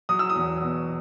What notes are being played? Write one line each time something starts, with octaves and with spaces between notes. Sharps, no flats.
F#3 D#6
E6
D#6
E2
B2